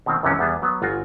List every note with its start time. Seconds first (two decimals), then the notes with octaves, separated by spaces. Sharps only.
0.06 B2 D#3 C4
0.23 C#2 F#2 C3 E3 F3 C#4
0.39 E2 G3 B3 G#4 A5
0.62 F#3 B3
0.82 G1 F4 F#4 F#5 G#5